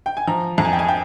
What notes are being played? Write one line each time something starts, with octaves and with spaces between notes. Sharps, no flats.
G5
G#5
F3 A#5
F2 A#5
G#5
G5
G#5
G5